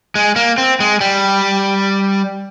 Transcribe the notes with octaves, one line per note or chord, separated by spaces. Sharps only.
G#3
A#3
C4
G#3
G3